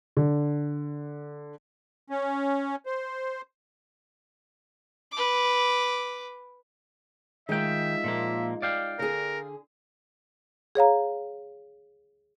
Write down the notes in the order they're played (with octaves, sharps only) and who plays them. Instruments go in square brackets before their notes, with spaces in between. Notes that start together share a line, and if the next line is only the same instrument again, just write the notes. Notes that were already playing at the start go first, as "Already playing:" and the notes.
[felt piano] D3
[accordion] C#4
C5
[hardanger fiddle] B4 D6
[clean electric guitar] D#3 G5 [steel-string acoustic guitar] G#3 D#4 F4 [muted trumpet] E5
[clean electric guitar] A#2 F3 A#3
D5 F5 G5
[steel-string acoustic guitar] D3 G#4 [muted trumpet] A#4
[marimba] G#4 C#5 F5 A#5